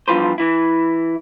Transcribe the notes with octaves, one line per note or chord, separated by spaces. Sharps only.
E2 G2 F3 F4 B4 C5
E3 E4